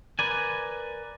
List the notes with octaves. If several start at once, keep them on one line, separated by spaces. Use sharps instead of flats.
A#4 B4 D5 G#5